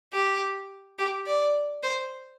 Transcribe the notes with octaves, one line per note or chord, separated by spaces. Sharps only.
G4
G4
D5
C5